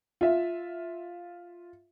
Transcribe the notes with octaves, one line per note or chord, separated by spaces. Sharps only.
F4 E5